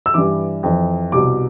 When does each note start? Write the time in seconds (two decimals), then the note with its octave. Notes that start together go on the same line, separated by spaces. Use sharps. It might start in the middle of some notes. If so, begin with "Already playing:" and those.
0.06 E6
0.14 G2 E3 D6
0.63 F2 E3
1.12 C2 B2 D6